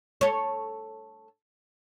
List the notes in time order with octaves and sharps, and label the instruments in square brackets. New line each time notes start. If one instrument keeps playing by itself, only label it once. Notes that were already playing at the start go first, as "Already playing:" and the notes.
[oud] A4 C#5